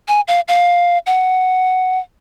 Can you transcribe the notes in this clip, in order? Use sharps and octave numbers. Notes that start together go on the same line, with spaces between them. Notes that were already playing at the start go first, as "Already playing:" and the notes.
G#5
F5
F5
F#5